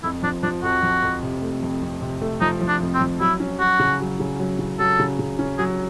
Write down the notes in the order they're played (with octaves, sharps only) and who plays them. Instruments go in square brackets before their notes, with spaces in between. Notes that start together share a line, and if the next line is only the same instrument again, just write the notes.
[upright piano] F2 [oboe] E4
[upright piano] F3 [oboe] D4
[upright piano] F3 [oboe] D4
[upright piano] F2 [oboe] F#4
[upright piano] F3
F2
C3
A3
F2
F2
C3
A3
[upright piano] F3 [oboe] D#4
[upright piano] F3
[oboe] D4
[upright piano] F2
[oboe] C4
[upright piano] F3
[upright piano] F#3 [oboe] E4
[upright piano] C#4
[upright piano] F#3 [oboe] F#4
[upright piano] C#3
F#3
C#3
F#3
C#3
[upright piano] F#3 [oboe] A4
[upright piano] C#3
C#3
C#4
[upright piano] F#3 [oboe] G#4